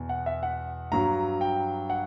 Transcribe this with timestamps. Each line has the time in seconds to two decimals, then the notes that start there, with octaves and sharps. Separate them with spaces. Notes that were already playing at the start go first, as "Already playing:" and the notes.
Already playing: E2 B2
0.09 F#5
0.26 E5
0.43 F#5
0.92 G2 F#3 A#5
1.41 G5
1.90 F#5